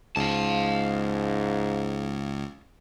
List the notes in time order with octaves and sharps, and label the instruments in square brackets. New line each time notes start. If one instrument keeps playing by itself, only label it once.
[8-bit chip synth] C#2 [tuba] G#2 [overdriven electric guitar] F5 A5